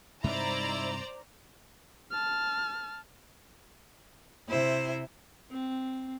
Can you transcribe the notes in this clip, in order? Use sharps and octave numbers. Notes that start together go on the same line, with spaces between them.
G2 C3 G#3 D#4 E4 C5 D5 A#5
A5 F6
C3 E4 C5
C4